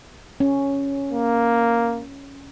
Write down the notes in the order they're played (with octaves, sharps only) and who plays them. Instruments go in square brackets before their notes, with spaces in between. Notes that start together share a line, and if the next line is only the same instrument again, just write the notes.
[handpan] C#4
[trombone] A#3